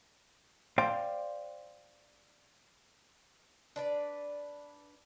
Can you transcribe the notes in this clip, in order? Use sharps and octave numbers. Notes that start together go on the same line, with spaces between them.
C5 D5 F5 G5
D4 B4 D5